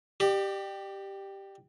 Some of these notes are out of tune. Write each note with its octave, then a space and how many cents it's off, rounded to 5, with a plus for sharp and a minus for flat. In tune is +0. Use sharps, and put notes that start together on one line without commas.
G4 +0 D5 +40